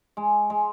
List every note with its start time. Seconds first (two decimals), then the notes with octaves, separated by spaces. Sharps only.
0.17 G#3
0.50 G#3